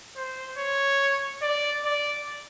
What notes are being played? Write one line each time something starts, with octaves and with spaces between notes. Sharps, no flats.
C5
C#5
D5
D5